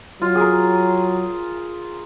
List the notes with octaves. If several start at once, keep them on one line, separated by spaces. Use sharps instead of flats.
F#3 F4
G#4 A#4